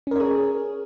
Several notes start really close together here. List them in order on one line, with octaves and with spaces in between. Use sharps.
C#4 A#4 C#5 G#4